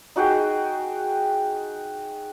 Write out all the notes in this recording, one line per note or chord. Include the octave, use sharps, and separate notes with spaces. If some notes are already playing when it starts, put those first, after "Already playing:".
D#4 F#4 G#4 G5